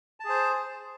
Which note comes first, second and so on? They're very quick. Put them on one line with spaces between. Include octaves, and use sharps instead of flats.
A5 G#4 C5